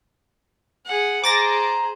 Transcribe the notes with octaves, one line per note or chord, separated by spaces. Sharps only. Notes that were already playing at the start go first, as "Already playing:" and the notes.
G#4 F#5
G#4 C5 A#5 D6 A6 A#6